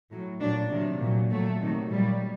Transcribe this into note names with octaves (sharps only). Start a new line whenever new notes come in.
A2 F#3
A#2 F#3 D4
C3 D#3 F#3
A#2 F#3
A#2 F#3 A3
C3 D#3 F#3
A#2 F#3 G3